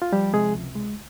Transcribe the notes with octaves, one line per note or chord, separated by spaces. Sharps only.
F4
F3 G3 G4
C3 G#3 G#4
C#2
G#3